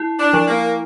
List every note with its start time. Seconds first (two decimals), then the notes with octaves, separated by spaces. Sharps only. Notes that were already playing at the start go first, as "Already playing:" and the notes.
Already playing: E4
0.20 D4
0.33 F3
0.48 A#3